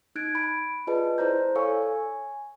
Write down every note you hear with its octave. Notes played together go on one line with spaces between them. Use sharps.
D#4 F#6 G#6 A6 D7
B5 D7
F4 G#4 B4 D5 D#5 A5
E4 C5 D5 A#5 G6
A4 C#5 F5 G#5 C#6 E6
G#5